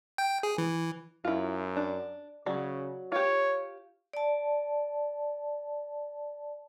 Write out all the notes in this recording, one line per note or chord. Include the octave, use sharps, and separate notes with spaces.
G5
G#4
E3
F#2 E4 F4
D4
C#3 F#3 F#4 D5
F4 G4 C#5
D5 A5